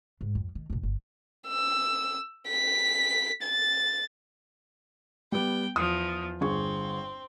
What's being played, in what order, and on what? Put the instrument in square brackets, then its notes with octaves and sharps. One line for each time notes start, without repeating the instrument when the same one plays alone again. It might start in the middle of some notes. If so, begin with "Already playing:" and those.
[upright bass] G#2
F2
D#3
A#1 F2
G1
[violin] E6
B6
A6
[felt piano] G3 B3 [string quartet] G5
[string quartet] E2 F3 [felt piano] D#6
[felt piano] G1 G#4 C#6 [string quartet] C4